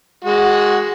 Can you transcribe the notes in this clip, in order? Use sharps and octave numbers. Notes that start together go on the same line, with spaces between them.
G#3 F#4